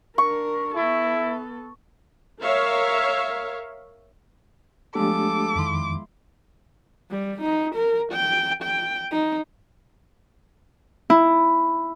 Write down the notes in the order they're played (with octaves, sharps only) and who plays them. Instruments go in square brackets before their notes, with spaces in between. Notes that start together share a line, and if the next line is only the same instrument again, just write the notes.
[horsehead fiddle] D4 A#4 [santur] C#6
[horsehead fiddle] B3 A4 [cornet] E4
[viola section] A#4 C#5 E5 F5
[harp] F3 G#3 B3 [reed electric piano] A3 D4 G4 [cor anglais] A4 [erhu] D6
[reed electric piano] F2 D#3 [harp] E4 B5 C6
[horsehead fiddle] G3
D#4
A#4
G5
G5
D#4
[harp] E4